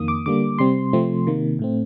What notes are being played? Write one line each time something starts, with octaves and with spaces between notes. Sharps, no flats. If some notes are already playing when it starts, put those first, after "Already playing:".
Already playing: F2 D#3 A#3 D#6
D6
D3 G3 A#3 D6
C3 G3 C4 C6
C3 F3 A3 C4
C3 D#3 A#3
A2 A3 C4